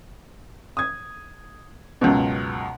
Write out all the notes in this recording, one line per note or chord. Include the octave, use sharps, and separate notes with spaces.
D#6 G#6
C#2 F#2 B2